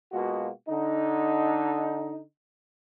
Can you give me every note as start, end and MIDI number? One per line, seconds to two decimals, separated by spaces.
0.12 0.49 47
0.12 0.49 56
0.12 0.49 58
0.12 0.49 65
0.12 0.49 66
0.68 2.21 50
0.68 2.21 63